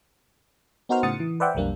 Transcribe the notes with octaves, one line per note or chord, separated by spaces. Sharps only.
B3 D#4 F#4 A#4 C5 F6
A2 C#3 F#5 D#6 A6 C#7
E3
B4 C5 D5 E5 F#5 G5
B1 F2 G3 A#3 D4